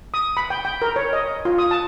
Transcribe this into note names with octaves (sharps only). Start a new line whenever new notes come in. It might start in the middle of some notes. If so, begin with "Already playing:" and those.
D#6
B5
G5
G5
A#4
C#5
D#5
F4
D#6
A5